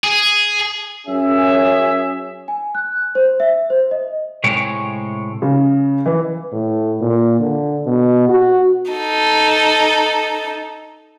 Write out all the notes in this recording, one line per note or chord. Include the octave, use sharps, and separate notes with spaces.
G#4
F#2 C#4 G#4 E5
G#5
F#6
C5
E5
C5
D#5
A2 C3 G#3 C#5 G5
C#3
E3
A2
A#2
D3
B2
F#4
D#4 A4